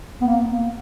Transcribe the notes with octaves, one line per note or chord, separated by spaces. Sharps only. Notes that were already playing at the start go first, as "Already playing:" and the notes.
B3
A#3